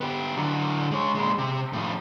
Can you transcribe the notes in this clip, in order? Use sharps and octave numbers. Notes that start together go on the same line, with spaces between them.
B3 G4
D3 F#3
G#3 C#5
A#2 G#3
C3
A2 F3